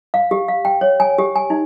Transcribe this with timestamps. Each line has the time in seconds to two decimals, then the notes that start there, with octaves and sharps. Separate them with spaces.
0.14 F5
0.31 G4
0.48 F5
0.65 G5
0.81 C#5
1.00 G#5
1.18 G4
1.36 G#5
1.50 D#4